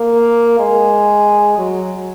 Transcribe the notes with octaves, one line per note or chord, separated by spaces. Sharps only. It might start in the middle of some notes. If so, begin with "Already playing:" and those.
Already playing: A#3
G#3
F#3